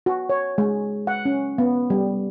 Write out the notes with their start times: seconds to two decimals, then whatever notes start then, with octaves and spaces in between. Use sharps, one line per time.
0.06 F#4
0.29 C#5
0.58 G#3
1.07 F#5
1.25 C#4
1.58 B3
1.90 G3